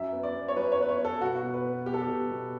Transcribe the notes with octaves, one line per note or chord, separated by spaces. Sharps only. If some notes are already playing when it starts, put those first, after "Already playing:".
Already playing: F#2 E5
B3
D5
B3
C#5
F#2 B4
C#5
B3 B4
C#5
B3
A4
B2 F#4
F#4
B2
B4
B3
B2 G4
A4
G4
B2
B2